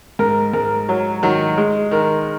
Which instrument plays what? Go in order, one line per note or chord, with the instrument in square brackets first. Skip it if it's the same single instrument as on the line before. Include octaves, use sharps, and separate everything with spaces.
[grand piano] G#2 [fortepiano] A#4
[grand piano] G#2 [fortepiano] A#4
[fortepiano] F#3
[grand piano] D#3 [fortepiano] F#3
[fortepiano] G#3
[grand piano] D#3 [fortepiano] A#4